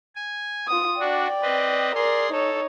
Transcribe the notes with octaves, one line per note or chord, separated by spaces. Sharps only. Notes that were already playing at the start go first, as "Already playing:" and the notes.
G#5
F4 D#6
D4 F#4 D5 G5
C4 B4 D#5
G#4 A#4 D5 C6
D#4 A4 C#5